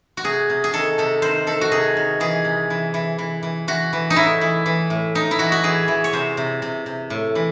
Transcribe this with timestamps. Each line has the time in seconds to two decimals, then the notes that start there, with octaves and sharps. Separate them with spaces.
0.17 F#4
0.24 C3 G#4
0.50 C3
0.64 G#4
0.73 D#3 A4
0.98 C3 A4
1.22 D#3 C5
1.47 D#3 A4
1.61 F#4
1.71 C3 G#4
1.97 D#3
2.20 E3 G#4
2.45 C3
2.70 E3
2.94 E3
3.18 E3
3.43 E3
3.68 E3 F#4
3.93 E3
4.10 D#4
4.16 A2 E4
4.41 E3
4.66 E3
4.90 A2
5.15 A2 D#4
5.31 E4
5.39 E3 F#4
5.52 F#4
5.63 E3 G#4
5.88 E3
6.04 C#5
6.13 C3 C5
6.37 C3
6.62 C3
6.86 C3
7.10 A2
7.35 E3